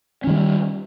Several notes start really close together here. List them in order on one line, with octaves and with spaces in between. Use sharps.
C#4 D#3 G3